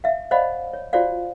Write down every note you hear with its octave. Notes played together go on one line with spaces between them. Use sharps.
E5 F5
C5 D5 D#5 F5 F#5 B5
C#5
F4 F#4 C5 D5 F5